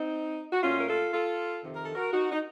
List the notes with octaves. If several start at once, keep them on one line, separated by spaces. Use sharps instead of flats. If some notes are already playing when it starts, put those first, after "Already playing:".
Already playing: C4 D#4
F#4
A#2 A3 C#4 F4
A#4
F4 A4
F4 A4
F2 C3 D#3
A#4
A4
F#4 A#4
D#4 F#4
D#4